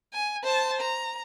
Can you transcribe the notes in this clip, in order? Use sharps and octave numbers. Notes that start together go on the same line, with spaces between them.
G#5
C5 A5
A#5